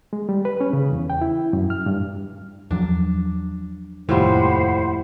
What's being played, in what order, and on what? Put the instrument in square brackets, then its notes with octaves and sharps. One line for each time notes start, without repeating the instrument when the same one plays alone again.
[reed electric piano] G#3
G3
B4
C#4
C#3
E2
G5
E4
F#2
F6
G2
[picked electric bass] E2 F3 F#3 [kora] D4
[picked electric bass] F1 D#2 [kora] A2 F3 G3 [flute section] C5 F#5 B5